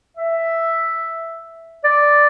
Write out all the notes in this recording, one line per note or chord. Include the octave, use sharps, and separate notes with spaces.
E5
D5